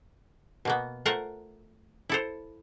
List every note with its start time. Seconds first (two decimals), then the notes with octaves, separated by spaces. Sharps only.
0.65 B2 A#3 B3
1.06 A3 F4 A#4 C5 F#5
2.09 E4 A4 C5